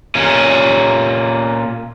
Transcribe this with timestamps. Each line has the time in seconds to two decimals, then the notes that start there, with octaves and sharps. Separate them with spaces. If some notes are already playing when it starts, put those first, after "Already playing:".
0.15 A#2 C#4